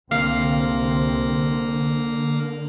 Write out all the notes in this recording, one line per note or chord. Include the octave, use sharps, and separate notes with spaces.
C2 D3 A#3 C4 F5